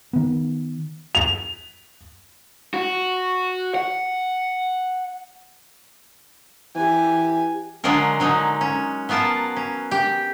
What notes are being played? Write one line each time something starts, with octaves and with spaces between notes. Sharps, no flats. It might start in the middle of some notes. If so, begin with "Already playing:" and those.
D#3 B3
F7
F#4
F#5
E3 G4 G#5
D3 F#3 G#3 D4 F4 A#4
D3 F#3 G#3 D#4
C#4
F#3 B3 F4 A#4 A5
C#4
G4 G5